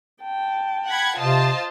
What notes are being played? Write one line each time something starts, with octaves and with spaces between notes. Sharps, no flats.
G5 A5
F#5 B5 G#6
C3 F4 C5 D#5 A5